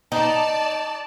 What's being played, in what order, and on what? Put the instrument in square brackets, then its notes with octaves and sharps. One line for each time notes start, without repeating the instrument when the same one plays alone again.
[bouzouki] D#4 [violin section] D5 A5